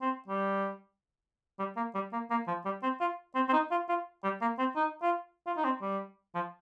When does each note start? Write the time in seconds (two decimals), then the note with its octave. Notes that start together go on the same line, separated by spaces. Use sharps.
0.02 C4
0.28 G3
1.59 G3
1.77 A#3
1.95 G3
2.13 A#3
2.31 A#3
2.48 F3
2.65 G3
2.83 C4
3.01 F4
3.35 C4
3.49 C4
3.53 D#4
3.71 F4
3.89 F4
4.24 G3
4.41 A#3
4.59 C4
4.76 D#4
5.02 F4
5.47 F4
5.57 D#4
5.65 C4
5.82 G3
6.35 F3